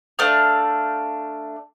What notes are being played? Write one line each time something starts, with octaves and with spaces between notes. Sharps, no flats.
A3 D4 F5 F6